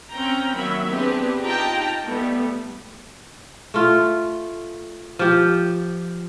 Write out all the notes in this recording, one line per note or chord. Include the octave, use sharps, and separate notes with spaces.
C4 C#4 G5 A#5
D#3 F#3 A#3 E5 B5
B3 C4 D4 G4 G#4 B4
D#4 F4 G4 G5 A5 A#5
G3 A3 B3
A3 F4
F3 G4